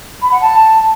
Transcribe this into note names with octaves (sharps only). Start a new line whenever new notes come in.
B5
F#5
A5